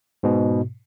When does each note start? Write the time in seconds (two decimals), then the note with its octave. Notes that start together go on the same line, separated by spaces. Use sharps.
0.23 G#2 B2